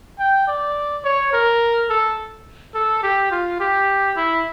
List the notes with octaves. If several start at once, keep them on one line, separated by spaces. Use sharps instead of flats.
G5
D5
C#5
A#4
A4
A4
G4
F4
G4
E4